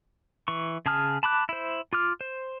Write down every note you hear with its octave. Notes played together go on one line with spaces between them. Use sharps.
E3 C#6
C#3 G#4 A5 D#6 F6
A5 B5 D6 F#6
E4 C5
F4 D6 F6
C5